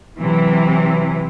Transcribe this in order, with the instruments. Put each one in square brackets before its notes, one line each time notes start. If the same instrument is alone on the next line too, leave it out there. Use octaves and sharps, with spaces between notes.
[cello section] C3 E3 F#3